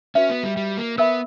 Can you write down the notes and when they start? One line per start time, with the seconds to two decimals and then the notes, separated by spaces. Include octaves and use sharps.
0.15 C#4 F#4 B4 E5
0.30 B3
0.43 G3
0.57 G3
0.77 A#3
0.98 B3 A#4 E5 B5